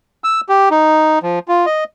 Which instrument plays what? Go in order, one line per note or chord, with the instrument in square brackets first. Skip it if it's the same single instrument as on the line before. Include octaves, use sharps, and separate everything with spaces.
[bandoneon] E6
G4
D#4
F3
F4
D#5